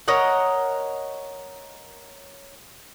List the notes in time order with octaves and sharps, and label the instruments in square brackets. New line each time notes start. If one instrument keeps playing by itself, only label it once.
[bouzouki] A#4 C#5 D#5 F#5